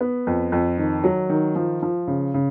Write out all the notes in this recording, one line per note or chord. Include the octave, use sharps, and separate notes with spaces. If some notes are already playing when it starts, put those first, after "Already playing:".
B3
F2
F2
D#3
F#3
D#3
F3
F3
C#3
C#3